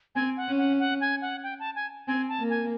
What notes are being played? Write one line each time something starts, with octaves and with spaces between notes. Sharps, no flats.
C4 G#5
F#5
C#4
F#5
F#5
G#5
F#5
G5
A5
G#5
C4 G#5
A5
A#3
G#5